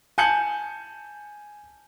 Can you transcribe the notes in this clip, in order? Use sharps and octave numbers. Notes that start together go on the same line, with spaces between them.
G#5 A5 G6 C#7 F#7